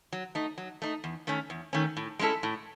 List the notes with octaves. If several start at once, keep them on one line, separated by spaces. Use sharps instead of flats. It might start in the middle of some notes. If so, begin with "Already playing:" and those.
F#3
A3 D#4
F#3
A3 D#4
E2
D#3 A3 C#4
E2
D#3 A3 C#4
A2
G#3 C#4 E4 A4
A2